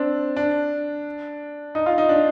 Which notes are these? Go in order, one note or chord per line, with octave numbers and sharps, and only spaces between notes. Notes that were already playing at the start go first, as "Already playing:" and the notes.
Already playing: C4 D4
D4
D#4
F4
D#4
D4